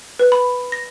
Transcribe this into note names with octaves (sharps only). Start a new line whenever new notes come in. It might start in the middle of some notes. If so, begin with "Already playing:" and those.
B4
B5
A#6